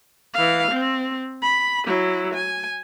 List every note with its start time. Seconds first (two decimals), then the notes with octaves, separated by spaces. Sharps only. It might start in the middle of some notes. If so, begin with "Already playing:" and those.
0.34 E3 F5
0.71 C4
1.42 B5
1.87 F#3 E4
2.34 G#5